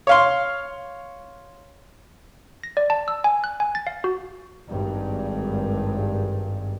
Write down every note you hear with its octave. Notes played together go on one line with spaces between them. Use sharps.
C#5 F5 C6
A#6
D5
A5
E6
G#5
F#6
G#5
A6
F5
F#4
G#1 G2